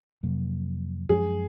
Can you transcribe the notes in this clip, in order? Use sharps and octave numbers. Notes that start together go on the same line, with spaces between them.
F2 C3 F#3 A#3
F#2 F3 G#3 C#4 G#4